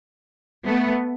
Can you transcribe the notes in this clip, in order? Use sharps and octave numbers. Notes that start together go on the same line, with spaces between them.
A3 B3